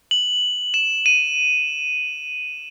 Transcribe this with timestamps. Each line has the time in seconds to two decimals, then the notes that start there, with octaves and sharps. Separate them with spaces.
0.11 F#7
0.74 E7
1.06 D#7